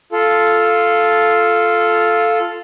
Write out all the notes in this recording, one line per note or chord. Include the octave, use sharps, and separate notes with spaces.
F4 A4